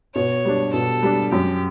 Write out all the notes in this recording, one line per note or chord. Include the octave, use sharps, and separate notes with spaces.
B2 C#5
G3 D4
B2 A4
G3 D4
F#2 G4